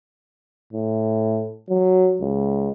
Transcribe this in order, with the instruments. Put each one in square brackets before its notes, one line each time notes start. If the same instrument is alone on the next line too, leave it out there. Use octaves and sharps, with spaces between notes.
[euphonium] A2
F#3
C#2